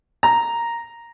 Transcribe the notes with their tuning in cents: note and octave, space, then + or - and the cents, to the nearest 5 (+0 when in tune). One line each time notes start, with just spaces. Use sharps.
A#5 +0